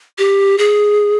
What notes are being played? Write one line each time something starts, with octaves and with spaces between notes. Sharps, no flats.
G4
G#4